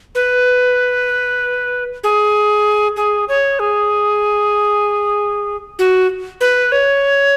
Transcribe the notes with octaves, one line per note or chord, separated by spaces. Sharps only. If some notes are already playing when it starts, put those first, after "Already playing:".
B4
G#4
G#4
C#5
G#4
F#4
B4
C#5